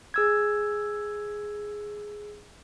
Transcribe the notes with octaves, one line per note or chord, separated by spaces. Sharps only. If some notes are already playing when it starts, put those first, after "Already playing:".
G#4 E6 G#6